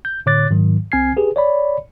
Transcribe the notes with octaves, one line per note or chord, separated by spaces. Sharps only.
G6
A2 D3 C#5 D6 F#6 A6
G#2 D#3 F#3
C2 C4 G#5 F6 G#6 C7
G4 G#4 B4
C#5 D5 B5